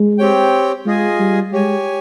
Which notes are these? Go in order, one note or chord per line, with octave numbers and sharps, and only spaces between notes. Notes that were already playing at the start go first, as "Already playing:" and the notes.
Already playing: G#3
C4 G4 C#5 G5
G#3 F4 G#4 D#5 G#5
G3
G#3 G4 C#5 G#5